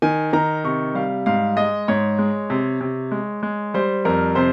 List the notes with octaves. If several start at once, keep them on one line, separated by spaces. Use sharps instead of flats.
D#3 G#5
D#3 A#5
C3 C#6
G3 F5
G#2 F5
G#3 D#5
G#2 C#5
G#3
C3
C3
G#3
G#3
G3 C5
F2 A#4
C3 C5